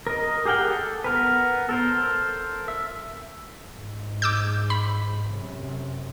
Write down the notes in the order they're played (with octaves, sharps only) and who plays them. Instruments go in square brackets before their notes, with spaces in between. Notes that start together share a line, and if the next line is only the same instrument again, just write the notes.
[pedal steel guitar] A#4 D#5
G4 G#4 A#4 F#5 G5
A4
B3 A#4 B4
A4 A#4 C5
E5
[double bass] G#2
[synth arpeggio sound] D6 E6 G6
B5
[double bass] F#2 C3